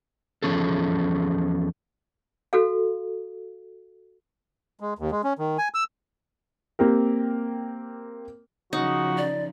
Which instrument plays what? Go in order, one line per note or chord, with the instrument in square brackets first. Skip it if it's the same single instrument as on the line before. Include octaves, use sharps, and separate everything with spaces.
[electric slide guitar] E2 F3 C#4 G#4 A4
[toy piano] F#4 A4 F5
[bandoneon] G#3
D#2
G#3
C#4
D#3
G#5
E6
[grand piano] A#3 C4 G4 A#4
[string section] C#3 F3 [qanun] D#4 [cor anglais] F#4
[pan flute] D5